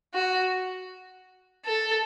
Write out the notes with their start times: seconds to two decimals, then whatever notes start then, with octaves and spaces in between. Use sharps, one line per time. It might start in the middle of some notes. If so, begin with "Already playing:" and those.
0.14 F#4
1.66 A4